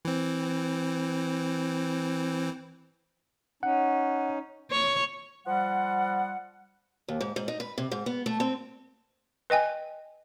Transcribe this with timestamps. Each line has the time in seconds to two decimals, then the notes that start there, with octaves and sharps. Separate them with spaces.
0.05 E3 C4
3.63 C#4 D#4 F#5
4.71 C#5
5.46 F3 G3 F#5
7.08 D#2
7.21 G#2
7.36 G#2
7.48 D#4
7.60 B4
7.78 C3
7.92 G#2
8.06 B3
8.26 A3
8.40 C4
9.50 B4 D#5 G5 G#5